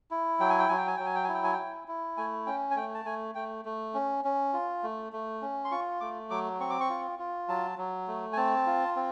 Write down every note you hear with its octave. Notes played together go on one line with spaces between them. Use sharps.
E4
F#3 G5
G#5
G5
F#3 G#5
G5
G#5
F#3 G5
G#5
G5
G#5
E4
G5
G#5
G5
E4
E4
A3 G#5
C#4 G5
G#5
A3 G5
A5
A3 G#5
A3 G5
A3
C#4
C#4
F4
A3
A3
C#4
C6
F4 C#6
A3 D6
F#3 D6
C4 C#6
D6
C#6
F4
F4
F#3 A5
F#3
A3
G#5
C4 A5
F4
C4